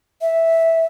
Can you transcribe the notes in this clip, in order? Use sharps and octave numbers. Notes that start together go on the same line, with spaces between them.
E5